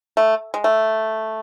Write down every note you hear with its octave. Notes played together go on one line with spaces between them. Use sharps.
A3
G#3
A3